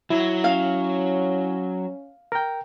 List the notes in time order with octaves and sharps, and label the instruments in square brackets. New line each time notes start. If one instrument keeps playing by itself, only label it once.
[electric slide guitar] F#3 [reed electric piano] E4
[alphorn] C#4 [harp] F5
[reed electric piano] A#4 G5